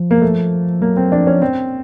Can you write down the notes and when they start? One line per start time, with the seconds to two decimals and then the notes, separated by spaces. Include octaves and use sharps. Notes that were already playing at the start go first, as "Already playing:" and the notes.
Already playing: F3
0.11 A#3
0.22 A3
0.82 F#3 A#3
0.97 C4
1.12 F3 D4
1.27 C#4
1.42 C4